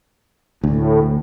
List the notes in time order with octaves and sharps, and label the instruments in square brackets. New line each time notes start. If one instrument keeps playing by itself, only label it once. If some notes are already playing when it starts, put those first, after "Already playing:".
[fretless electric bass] D2 [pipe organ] A2